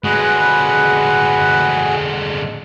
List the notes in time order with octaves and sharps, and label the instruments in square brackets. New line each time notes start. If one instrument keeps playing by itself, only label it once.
[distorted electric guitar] D3 G#3 [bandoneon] F#4 G#4 F#5 [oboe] B4